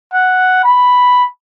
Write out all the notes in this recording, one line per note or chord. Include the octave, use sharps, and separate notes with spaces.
F#5
B5